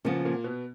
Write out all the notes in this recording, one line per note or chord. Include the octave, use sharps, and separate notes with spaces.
A#2 C#3 F3 A#3 B3
A#2 A#3
B2 B3